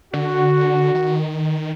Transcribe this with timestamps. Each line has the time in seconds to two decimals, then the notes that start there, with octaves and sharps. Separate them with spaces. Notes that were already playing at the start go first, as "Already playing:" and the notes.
0.14 D3 F#4
0.94 D#3